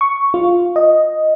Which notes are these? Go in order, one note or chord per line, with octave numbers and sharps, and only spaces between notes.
C#6
F4
D#5